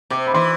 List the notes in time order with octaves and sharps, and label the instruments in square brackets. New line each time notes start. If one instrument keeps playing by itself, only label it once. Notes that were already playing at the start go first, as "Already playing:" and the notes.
[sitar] C3 [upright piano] D6
[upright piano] B5
[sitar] E3 [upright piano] C6